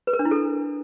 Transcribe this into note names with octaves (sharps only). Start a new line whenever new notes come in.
B4
A#4
D4
E4
A4